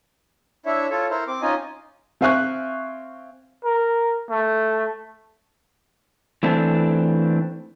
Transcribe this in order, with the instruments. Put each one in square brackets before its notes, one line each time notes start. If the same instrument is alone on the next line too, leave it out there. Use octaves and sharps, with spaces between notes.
[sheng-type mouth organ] D4 E4 C#5 E5
F4 A4 C#5
E4 A#4 C5
C4 D6
C#4 D#4 F4 D#5 G#5
[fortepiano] C4 E5 F5 G#5 C#6 F#6
[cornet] A#4
A3
[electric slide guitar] E3 A3 C4 D4